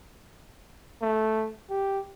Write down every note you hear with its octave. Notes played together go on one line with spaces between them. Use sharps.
A3
G4